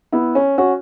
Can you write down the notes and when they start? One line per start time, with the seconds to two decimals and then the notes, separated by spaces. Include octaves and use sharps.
0.12 B3 E4
0.35 C#4
0.58 C#4 F#4